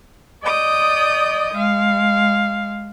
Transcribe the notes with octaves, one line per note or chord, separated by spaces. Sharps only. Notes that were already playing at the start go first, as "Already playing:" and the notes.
D5 D#5 D#6 G6
G#3 F5